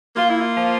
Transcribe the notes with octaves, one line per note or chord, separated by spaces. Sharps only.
A#3 F4
E4
F4
F3